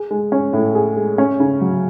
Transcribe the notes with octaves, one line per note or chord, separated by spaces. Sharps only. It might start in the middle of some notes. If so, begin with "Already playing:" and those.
Already playing: G#4
G#3
C#4
A2
G#4
G#3
C#4
C#3
F#3